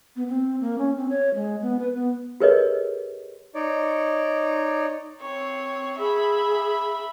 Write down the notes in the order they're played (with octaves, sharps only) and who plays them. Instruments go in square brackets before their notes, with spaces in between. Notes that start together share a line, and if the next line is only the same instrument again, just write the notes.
[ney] B3
C4
A#3
C#4
C4
C#5
G#3
B3
B4
B3
[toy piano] G4 G#4 A#4 B4 C#5 D#5
[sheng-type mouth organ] D#4 C#5 D5
[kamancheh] C4 C#5
[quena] G#4 [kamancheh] E5 B5